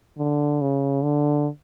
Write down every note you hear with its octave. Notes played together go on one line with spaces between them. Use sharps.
D3
C#3
D3